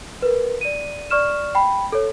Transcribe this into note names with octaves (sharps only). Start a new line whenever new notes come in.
A#4 B4
D5 D#7
D5 C#6 F6 E7
G5 B5
A4 C#5